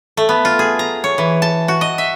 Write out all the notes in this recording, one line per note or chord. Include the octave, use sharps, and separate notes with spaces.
A3
B3
F4
G#4
A#5
C#5
E3
A5
F#4
D#5
E5